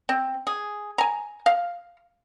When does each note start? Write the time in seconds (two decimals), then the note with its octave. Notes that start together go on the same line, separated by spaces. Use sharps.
0.09 C4
0.47 G#4
0.98 G#5 A#5
1.46 F5